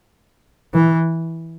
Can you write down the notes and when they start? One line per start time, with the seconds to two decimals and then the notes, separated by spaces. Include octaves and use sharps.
0.74 E3